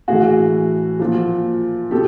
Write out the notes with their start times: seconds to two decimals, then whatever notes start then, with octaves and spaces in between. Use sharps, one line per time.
0.08 A2 E3 F#4 G#4
1.00 A#2 F3
1.91 B2 G4 A4